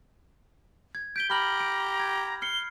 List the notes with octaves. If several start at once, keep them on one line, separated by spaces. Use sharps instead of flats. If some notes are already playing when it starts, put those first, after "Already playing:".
G#6
G6 B6 D7 G7
G4 A#5 B5 F6 F#7
D7
G#6
F6 C7 C#7 G7